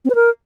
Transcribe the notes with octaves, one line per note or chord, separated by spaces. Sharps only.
C4
B4
A#4